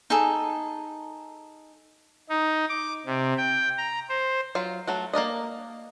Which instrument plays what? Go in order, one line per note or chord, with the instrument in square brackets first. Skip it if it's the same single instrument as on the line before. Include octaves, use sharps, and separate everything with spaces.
[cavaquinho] D#4 G#4 A4
[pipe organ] D#4
D6
C3
G5
A#5
C5
[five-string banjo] F#3 F4
F#3 A3 F#4
A#3 A#4 D5 D#5